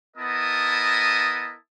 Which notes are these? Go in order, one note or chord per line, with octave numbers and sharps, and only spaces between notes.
B3 E4 A#4 D#5 A5 D#6